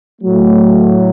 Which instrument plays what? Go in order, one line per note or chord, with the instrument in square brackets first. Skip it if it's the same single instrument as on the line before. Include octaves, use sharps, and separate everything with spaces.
[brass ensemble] A2 F#3 A3